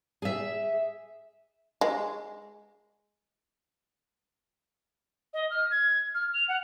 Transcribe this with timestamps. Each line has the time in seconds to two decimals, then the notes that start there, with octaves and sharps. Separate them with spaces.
0.22 G#4 E5
1.81 G#3
5.34 D#5
5.50 F6
5.71 G#6
6.15 F6
6.34 F7
6.48 F#5